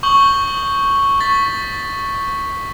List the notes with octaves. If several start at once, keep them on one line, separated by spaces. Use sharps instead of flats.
C#6 D#6 G6 F#7 G7
C#6 A6 B6